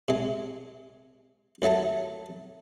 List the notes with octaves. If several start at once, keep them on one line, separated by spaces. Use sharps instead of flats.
C3 G#3
D#2 F#3 A3 A5 A#5